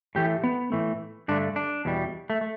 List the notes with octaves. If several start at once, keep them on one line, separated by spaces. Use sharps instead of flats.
A2 E3 A3 G4
B3
A2 E3 A3
G2 D3 A3 D4
D4
E2 B2 G3
A3
A3